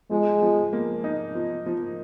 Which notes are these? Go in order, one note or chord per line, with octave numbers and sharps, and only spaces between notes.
F3 G#3
F3
A#3
D#4
F3
F3